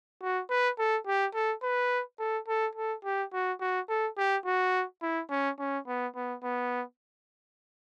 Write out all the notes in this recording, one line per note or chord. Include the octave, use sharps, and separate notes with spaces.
F#4
B4
A4
G4
A4
B4
A4
A4
A4
G4
F#4
F#4
A4
G4
F#4
E4
C#4
C#4
B3
B3
B3